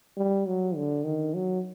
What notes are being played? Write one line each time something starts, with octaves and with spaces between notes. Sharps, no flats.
G3
F#3
D3
D#3
F#3